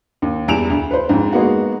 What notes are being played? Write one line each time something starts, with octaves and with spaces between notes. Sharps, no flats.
D#2
E2 G3 D7 E7 F7
D2
B4 C5
F2 G#2
G#3 A#3 B3 D#4 F#4